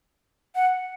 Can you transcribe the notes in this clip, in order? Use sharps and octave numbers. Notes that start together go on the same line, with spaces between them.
F#5